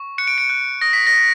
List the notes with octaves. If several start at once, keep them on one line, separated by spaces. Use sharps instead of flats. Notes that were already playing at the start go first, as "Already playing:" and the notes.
Already playing: C#6
F#6 C#7
D7
C#7
F#6
D#6 A#6
B6
A#6
D#6